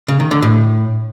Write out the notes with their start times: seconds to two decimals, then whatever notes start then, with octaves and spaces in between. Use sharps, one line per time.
0.08 C#3
0.20 D#3
0.31 D3
0.42 A2